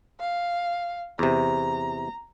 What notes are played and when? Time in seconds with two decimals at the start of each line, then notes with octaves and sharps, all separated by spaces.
0.20 F5
1.19 E2 C3 A#5